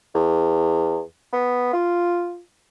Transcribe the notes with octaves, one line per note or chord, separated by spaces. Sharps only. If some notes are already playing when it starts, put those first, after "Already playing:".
E2
B3
F4